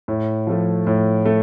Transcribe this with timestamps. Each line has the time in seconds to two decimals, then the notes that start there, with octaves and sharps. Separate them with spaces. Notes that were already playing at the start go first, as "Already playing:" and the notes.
0.08 A2
0.47 F3 A3
0.87 A2
1.26 A3